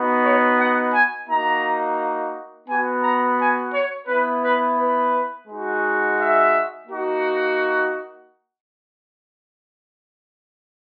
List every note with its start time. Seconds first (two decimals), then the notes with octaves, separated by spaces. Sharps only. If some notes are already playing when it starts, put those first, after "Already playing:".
Already playing: B3 D#4 F#4
0.23 C#5
0.58 F#5
0.92 G#5
1.28 A#3 D#4 F#4 A#5
2.68 B3 F#4 G#5
3.02 A#5
3.37 G#5
3.73 C#5
4.07 B3 E4 B4
4.42 B4
4.78 B4
5.48 G#3 D#4 F#4
6.18 E5
6.88 A#3 D#4 F#4